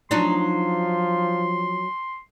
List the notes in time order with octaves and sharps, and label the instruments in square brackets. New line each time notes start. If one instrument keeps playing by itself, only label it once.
[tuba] F3 [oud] F#3 D4 D#4 [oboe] C6